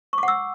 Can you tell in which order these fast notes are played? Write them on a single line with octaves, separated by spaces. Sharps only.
C#6 D6 F#5 E6